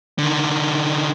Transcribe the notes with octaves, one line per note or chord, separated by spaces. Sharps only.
D3 D#3